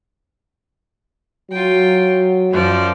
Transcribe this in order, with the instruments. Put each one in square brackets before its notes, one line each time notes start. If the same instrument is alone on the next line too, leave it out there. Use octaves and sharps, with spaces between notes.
[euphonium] F#3 [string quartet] F4 G5
[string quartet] F#2 F3 D5